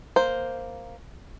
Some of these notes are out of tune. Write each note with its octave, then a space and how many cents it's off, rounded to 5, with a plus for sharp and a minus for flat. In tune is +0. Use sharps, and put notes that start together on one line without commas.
A#3 +0 C5 +0